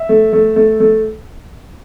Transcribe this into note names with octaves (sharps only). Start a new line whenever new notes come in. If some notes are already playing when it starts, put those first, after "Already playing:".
Already playing: E5
A3
A3
A3
A3